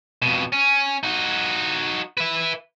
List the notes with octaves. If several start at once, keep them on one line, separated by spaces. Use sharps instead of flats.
F2 B2
C#4
D#4 F#4
B4 E5